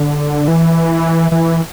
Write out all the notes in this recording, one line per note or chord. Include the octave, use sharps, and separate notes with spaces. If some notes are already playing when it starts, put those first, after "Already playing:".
Already playing: D3
E3
E3